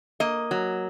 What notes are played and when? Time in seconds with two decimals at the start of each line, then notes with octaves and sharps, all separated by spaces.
0.20 A#3 D#5
0.51 F#3